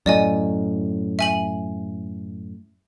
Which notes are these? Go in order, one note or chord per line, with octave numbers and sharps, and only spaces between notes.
F#2 A2 D5 D#5 G#5
E5 G#5 F#7